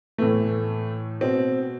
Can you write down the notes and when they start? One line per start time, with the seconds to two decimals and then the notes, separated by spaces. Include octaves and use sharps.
0.18 A2 E3 A3
1.21 B2 C4